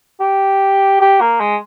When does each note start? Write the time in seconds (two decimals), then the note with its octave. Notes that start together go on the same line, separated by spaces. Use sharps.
0.20 G4
1.01 G4
1.21 A#3
1.40 G#3